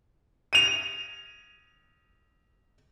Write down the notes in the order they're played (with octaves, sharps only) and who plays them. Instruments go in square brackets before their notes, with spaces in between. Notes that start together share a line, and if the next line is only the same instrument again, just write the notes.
[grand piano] D#7 F7